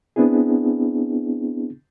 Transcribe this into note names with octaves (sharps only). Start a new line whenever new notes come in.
B3 C4 D4 E4 G#4